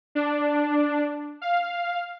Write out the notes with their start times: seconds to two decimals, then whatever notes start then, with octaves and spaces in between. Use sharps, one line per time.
0.15 D4
1.42 F5